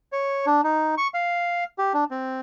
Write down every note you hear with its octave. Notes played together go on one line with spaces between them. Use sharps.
C#5
D4
D#4
C#6
F5
G4
D4
C4